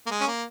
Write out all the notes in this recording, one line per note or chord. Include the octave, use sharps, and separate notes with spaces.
A#3
G#3
C#4
A#3